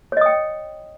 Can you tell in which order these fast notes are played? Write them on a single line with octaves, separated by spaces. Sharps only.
C#5 D#5 D#6 G5